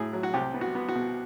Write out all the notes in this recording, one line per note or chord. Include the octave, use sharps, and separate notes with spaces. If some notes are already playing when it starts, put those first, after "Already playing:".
Already playing: A2 F#3 G#4
F#3
F#4
C2 G4
B3
F#4
B3
F#4
B2